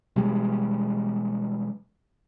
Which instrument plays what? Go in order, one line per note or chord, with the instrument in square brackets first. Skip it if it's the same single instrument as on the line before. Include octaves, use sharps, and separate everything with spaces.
[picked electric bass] B2 E3 G3 G#3